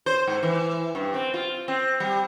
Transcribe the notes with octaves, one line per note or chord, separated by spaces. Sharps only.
C5
G#2
E3
G2
C4
F4
C4
G3